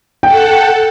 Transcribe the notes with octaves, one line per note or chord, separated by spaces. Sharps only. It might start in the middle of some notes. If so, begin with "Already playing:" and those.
A4 F#5 G5